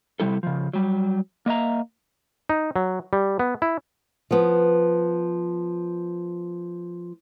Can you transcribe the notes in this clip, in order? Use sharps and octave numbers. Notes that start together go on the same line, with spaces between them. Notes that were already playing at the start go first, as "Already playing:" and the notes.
C3 G3 E4 A4
C#3 F3
F#3 G3
A#3 D#5 E5 A#5
D#4
F#3
G3
B3
E4
F3 B3